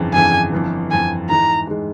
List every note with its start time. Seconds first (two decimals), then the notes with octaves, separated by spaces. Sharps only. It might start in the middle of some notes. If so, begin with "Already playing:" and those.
Already playing: G1 F2 C#3 E3
0.13 G1 F2 C#3 E3 G#5
0.52 G1 F2 E3
0.91 G1 F2 E3 G#5
1.29 G#2 E3 G#3 A#5
1.67 G#2 E3 G#3